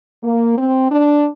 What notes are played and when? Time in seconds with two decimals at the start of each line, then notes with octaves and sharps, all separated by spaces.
0.23 A#3
0.58 C4
0.91 D4